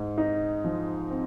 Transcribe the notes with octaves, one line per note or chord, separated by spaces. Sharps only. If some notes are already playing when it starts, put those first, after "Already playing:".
Already playing: G#2
D#4
F3
C4